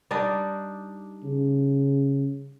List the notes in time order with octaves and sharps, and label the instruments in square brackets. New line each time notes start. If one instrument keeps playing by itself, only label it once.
[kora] G3 D4 D#4
[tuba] C#3